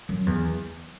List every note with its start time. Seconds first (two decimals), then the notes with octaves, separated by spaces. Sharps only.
0.09 F#2
0.26 E2